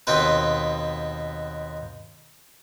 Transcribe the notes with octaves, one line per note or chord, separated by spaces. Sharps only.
D#2 B2 C4 B4